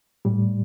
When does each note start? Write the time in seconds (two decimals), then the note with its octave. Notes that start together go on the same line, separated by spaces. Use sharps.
0.25 A2 G3